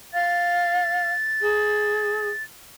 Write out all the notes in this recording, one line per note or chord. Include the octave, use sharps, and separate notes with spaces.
F5 A6
G#4